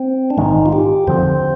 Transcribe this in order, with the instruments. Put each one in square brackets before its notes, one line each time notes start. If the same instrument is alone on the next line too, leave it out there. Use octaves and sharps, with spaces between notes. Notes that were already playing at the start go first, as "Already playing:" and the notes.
Already playing: [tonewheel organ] C4
D4
[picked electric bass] A#1 G#2 D#3 G#3 [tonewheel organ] D#4
[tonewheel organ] F4
G4
[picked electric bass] F2 D3 F3 C4 [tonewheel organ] C5